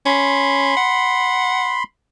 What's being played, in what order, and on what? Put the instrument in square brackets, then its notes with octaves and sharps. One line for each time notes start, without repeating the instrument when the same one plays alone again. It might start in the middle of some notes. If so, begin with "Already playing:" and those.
[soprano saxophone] C#4 [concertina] B5 C6
[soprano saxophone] F#5